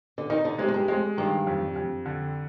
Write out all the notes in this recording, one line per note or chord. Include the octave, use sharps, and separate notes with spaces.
D3
D#3 D#4
D3
C3 G#3
F2
G2
F2 G#3
G2 D#3
F2
F2
D3